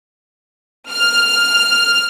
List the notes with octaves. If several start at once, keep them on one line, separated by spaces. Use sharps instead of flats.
F6